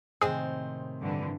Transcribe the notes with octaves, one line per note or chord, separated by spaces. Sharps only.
A2 C3 D#3 G#3 C4 G#4
G2 D3 E3